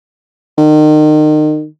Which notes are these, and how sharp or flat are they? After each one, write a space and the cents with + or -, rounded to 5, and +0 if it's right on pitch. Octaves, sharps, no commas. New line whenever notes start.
D#3 -30